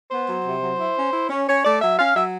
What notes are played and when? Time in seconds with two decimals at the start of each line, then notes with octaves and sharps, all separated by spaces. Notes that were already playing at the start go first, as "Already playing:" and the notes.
0.11 B3 C5
0.28 F#3
0.45 C3
0.62 F#3
0.79 E4
0.96 C#4
1.13 E4
1.30 C#4
1.48 C#4 C#5
1.65 A3 D5
1.82 F#3 E5
1.98 C#4 F5
2.16 F#3 E5